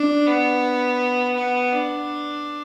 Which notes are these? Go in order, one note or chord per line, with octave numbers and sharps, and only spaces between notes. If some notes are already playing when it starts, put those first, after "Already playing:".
Already playing: D4
B3
B3
D4